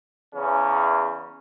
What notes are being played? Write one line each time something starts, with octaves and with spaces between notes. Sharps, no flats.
E2 C#3 C#4